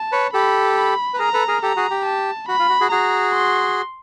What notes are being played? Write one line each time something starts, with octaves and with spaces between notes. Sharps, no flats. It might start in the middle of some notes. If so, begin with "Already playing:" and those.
Already playing: A5
B4 C#5
G4 A4 B5
B5
B4
G#4 A#4 A#5
A4 B4
G#4 A#4
G4 A4 A#5
F#4 G#4
G4
A5
F#4 B5
F4
F#4
F#4 G#4
F#4 G#4 A#5
C6